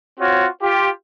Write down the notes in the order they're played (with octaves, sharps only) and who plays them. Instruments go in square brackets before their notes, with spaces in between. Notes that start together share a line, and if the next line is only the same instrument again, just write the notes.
[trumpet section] C4 F4 F#4 C#5
F4 G4